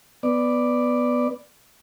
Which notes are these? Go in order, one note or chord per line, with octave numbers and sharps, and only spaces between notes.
B3 D5